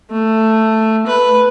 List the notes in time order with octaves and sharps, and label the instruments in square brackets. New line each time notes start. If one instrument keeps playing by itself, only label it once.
[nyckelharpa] A3
B4